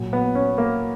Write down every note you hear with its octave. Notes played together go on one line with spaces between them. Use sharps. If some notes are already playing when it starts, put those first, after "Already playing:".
Already playing: A#2 F#3
B3
C#4
A#3